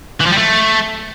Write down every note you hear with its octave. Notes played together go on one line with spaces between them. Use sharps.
E3
F3
G3
A3